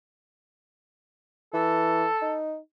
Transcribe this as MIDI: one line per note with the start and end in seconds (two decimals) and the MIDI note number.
1.53 2.06 52
1.53 2.38 69
2.22 2.57 63